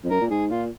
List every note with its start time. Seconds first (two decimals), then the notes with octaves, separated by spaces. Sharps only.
0.04 F2
0.10 F#2 A#4
0.21 A#2
0.30 G#2 G#4
0.50 A#2 F4